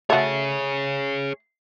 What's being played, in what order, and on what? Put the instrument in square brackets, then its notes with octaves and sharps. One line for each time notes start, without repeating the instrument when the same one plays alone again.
[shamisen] A3 F#4 [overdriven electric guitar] G#4 C#5